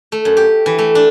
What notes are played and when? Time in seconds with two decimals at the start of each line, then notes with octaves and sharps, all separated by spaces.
0.12 A3
0.25 F#2
0.37 G4
0.66 E3
0.78 A3
0.95 D4